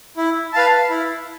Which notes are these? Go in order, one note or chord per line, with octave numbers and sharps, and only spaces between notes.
E4
B4 F5 A5
E4